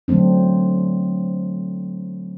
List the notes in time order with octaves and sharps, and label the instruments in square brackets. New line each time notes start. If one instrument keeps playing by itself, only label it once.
[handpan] D3 F#3 A3 C4 D4